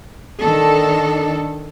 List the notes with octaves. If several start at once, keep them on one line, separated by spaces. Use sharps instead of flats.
D#3 D4 A4